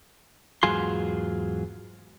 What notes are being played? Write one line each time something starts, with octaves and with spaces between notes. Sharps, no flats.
E2 G#2 F#3 F4 G#4 C6